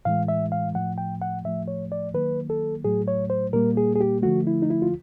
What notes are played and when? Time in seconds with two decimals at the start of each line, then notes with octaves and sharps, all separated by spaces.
0.05 A2 E3 G#3 F5
0.28 E5
0.52 F5
0.75 A2 F3 A3 F#5
0.98 G5
1.22 F#5
1.45 A2 F3 A3 E5
1.68 C#5
1.92 D5
2.14 D#3 F#3 A#3 B4
2.50 A4
2.84 A2 F#3 A3 G#4
3.08 C#5
3.30 C5
3.53 A#2 G3 A#3 A#4
3.77 G#4
3.95 G#4
4.01 G4
4.23 D3 F3 A3 F#4
4.47 E4
4.62 D#4
4.70 E4
4.82 F4